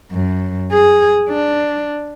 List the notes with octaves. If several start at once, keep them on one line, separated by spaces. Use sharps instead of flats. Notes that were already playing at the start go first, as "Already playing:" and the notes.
F#2
G#4
D4